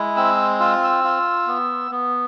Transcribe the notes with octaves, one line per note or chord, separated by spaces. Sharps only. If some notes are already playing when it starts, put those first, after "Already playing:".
Already playing: G#3 E4
C4 E6
F4 E6
E6
F4
B3
B3